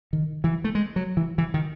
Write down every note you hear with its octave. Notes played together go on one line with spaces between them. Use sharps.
D#3
E3
A3
G#3
F#3
E3
E3
D#3